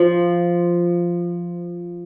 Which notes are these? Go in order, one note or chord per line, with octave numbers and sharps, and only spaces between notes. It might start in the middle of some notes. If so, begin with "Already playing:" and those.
Already playing: F3